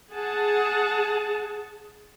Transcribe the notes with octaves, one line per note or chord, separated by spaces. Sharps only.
G#4 F#5 A5